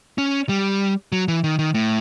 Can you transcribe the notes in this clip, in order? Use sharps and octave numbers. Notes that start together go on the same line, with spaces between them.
C#4
G3
F#3
E3
D#3
D#3
A2